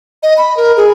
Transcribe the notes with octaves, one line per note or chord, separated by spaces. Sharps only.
D#5
B5
A#4
G#4